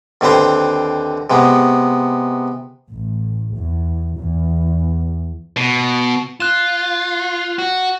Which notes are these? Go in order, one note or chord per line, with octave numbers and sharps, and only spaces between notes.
D#2 D3 C4 B4 C5
C3 G#3 B3
A1
E2
E2
B2
F4 F#6 E7
F#4